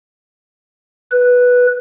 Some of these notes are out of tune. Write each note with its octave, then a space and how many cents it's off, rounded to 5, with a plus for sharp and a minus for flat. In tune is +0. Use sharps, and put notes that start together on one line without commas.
B4 -5